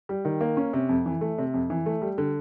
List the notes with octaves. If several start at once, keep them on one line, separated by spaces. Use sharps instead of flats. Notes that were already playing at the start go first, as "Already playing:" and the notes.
G3
D#3
A#3
C#4
C3
F2
E3
A3
C3
F2
E3
A3
G3
D3